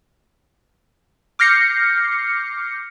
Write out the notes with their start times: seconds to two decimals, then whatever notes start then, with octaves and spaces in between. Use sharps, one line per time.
1.39 D6 F6 G6 A#6 C7 C#7